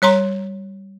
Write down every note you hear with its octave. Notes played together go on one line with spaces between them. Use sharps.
G3 C#5 A#5 C6